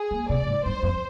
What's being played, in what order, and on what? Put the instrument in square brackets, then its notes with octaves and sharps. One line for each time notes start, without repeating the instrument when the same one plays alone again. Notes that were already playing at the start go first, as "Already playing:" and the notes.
Already playing: [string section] G#4
[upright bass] A#3
[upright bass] C3 [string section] D5
[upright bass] G#2
[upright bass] G2 [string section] C5
[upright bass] F2